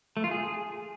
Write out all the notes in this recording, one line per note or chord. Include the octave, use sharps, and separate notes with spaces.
A3
F4
G#4